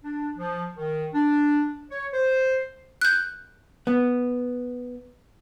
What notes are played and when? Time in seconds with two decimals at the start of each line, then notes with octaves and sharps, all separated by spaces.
0.03 D4
0.36 F3
0.77 D#3
1.14 D4
1.91 C#5
2.13 C5
3.01 F#6 G6
3.87 B3